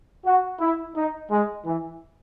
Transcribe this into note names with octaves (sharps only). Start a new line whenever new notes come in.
F#4
E4
D#4
G#3
E3